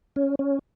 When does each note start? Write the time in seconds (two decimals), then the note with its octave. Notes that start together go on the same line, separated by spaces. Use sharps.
0.16 C#4
0.39 C#4